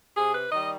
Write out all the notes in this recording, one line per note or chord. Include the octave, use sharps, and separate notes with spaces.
C3 G#4
B4
D#3 G3 D#5